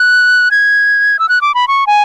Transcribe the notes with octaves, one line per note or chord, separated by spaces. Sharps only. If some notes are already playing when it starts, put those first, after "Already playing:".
Already playing: F#6
G#6
E6
F#6
D6
B5
C#6
G#5